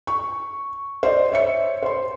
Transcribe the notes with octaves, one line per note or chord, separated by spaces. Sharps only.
C#6
C5 D5 D#5
C#5 E5 C#7
C5 C6